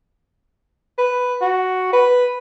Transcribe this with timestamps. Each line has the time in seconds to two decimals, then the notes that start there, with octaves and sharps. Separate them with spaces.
0.98 B4
1.41 F#4
1.93 B4